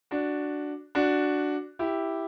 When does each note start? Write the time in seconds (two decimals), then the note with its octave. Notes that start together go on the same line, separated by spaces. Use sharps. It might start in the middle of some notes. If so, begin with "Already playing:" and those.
0.11 D4 F#4
0.95 D4 F#4
1.79 E4 G4